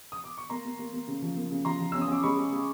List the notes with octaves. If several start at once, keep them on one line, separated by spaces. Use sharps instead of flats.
D#6
D6
C#6
A#3 A#5 C6
A#3
A#3
A#3
C#3
F3
A#3
C#3
F3 A#5 C6
F3
C#4 E6
D#6
C#4 D6
G#3 B5 C#6
G#3
G#3